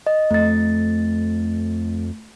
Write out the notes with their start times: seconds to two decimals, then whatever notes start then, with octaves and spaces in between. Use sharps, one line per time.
0.07 D#5
0.31 F2 A3 A6